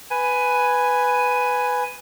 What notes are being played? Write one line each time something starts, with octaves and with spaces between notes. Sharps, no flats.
B4 G#5